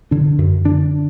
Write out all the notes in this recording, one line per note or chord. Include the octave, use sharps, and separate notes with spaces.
D3 D4
F#2
D3 D4